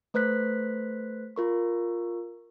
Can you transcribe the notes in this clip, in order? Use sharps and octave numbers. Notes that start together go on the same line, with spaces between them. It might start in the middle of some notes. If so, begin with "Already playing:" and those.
A3 B4 C5 F#6 B6
F4 A#4 C#6